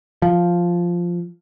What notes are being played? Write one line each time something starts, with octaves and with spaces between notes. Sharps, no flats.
F3